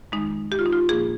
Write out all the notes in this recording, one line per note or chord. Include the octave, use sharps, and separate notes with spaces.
F2 D#3 G#3 D#4
G4
F4
D#4
F4
A#2 F3 A#3 G#4